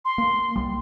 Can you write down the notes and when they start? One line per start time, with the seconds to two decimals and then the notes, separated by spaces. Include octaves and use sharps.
0.05 C6
0.18 A#3
0.56 B1 G3